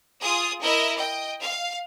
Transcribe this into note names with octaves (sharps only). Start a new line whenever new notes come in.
F4 G#4 D#6
E4 A#4 D#5 E5
D#5 G5
F5